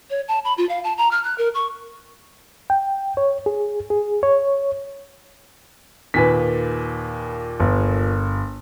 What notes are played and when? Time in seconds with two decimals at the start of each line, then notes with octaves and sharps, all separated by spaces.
0.10 C#5
0.28 A5
0.45 B5
0.58 F4
0.69 F5
0.84 A5
0.98 A#5
1.11 F6
1.24 F#6
1.38 A#4
1.54 C#6
2.70 G5
3.17 C#5
3.46 G#4
3.90 G#4
4.23 C#5
6.14 D#2 A#2 B4 G#5 B6
7.60 G1